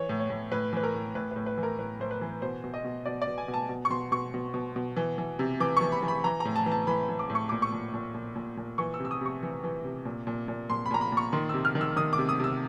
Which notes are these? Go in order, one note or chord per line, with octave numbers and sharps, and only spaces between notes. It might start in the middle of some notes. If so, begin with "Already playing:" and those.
Already playing: E3 C#5
A2
C#5
A2
A2 B4
E3 B4
A#4
A2
A2 B4
A2 B4
B4
E3
A#4
A2 B4
A2 C5
B4
E3
B2 C5
B2
D#5
B2
B2 D5
D5
B2
G#5
B2
A5
B2
C#6
B2 C6
B2 C#6
B2
B2
B2
E3
E3
C3
E3 D6
E3 C#6
B5
E3
B5
E3 A#5
A2 A#5
A5
E3
A5
E3 B5
E3
D6
A2
C#6
A#2 D6
C#6
A#2
A#2
A#2
A#2
A#2
E3 C#6
E6
C3
E6
D#6
C3 C#6
E3
E3
C3
A#2
A#2
A#2
A#2 C6
B5
A#2 A#5
B5
A#2 C#6
D#3 C6
C3 E6
F6
D#3
E6
D#3 D#6
D6
C3
D#6
C3 E6